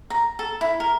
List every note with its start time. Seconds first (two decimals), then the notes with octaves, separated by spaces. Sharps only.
0.10 A#5
0.39 A4
0.61 E4
0.80 A#4